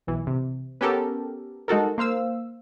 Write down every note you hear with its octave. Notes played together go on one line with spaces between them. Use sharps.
B1 E3
C3
B3 C#4 G4 A4 A#4
G#3 D#4 F#4 A4 A#4
A#3 C5 F5 E6